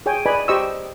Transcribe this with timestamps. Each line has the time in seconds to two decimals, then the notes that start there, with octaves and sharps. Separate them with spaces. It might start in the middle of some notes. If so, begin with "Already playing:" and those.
0.06 G#4 C#5 G5 G#5
0.26 B4 D5 D#5 G#5 B5
0.48 G4 C5 D#5 G5 C#6 E6